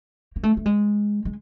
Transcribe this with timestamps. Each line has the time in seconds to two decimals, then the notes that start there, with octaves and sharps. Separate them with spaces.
0.36 A#3
0.43 A3
0.57 A3
0.66 G#3
1.25 G#3